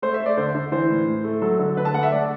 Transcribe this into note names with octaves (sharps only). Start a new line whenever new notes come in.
A3 C5
E5
A3
D5
D3 C5
D3
E3 C5
A2
A2
A3
F#3 A4
D3
D3 B4
A5
A3 F#5
E5
A3 D5